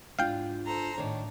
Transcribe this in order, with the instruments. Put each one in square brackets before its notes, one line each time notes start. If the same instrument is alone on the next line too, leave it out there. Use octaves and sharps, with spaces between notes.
[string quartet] G#2 [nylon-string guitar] D4 F4 [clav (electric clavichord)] F5 G5
[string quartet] A4 C5 A#5
[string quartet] A2 D4 [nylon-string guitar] D#3 C#5